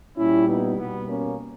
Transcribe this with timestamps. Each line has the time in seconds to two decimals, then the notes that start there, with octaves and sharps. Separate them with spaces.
0.16 A#2 G3 C#4 E4
0.47 B3 D#4
0.77 B2 G3 B3
1.08 A#3 C#4